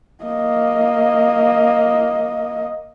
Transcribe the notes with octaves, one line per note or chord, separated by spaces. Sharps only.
A#3 D#5